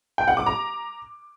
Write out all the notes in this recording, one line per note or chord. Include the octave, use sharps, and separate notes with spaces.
G5
F#5
D6
A#5